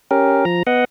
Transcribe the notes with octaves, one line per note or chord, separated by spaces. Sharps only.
C#4 G4 A#4
F3 A#5
B3 D#5 F#5